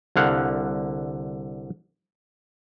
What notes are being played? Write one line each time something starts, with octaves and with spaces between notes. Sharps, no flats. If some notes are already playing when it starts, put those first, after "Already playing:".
C2 D3 F5 F#5